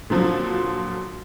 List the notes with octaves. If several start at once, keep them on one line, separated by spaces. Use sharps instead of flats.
A#2 D3 F3 F#3 C4